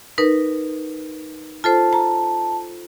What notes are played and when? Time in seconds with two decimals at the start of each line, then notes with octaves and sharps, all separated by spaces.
0.18 D#4 A#4 B4
1.64 F4 A4 C5 A5
1.93 A#5